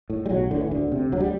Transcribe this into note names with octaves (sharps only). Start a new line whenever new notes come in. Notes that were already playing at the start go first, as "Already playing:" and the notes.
A2
G3
B1 F#3
A2 D3
E3
D2 D3
C3
D2 F#3
G3